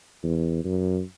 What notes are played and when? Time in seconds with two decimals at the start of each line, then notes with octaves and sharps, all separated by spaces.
0.23 E2
0.64 F#2